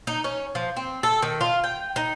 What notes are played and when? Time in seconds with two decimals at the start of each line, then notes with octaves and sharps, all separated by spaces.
0.07 D#4
0.24 C#4
0.55 F3
0.76 C4
1.03 A4
1.22 D#3
1.41 F4
1.64 G5
1.96 D#4